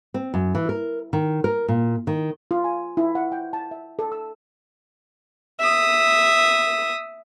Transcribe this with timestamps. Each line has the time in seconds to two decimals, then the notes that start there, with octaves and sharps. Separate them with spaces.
0.14 C4
0.34 F#2
0.55 E3
0.69 A#4
1.13 D#3
1.44 A#4
1.68 A#2
2.07 D#3
2.51 F4
2.64 G#5
2.97 E4
3.15 F#5
3.32 G5
3.53 A5
3.71 E5
3.99 A4
4.12 E6
5.60 E5 D#6